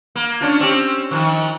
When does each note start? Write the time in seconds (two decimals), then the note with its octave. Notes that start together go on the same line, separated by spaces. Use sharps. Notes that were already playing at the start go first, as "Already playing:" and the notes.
0.15 A#3
0.41 C#4 D4 F4
0.60 C4 C#4 G4
1.11 D#3 F3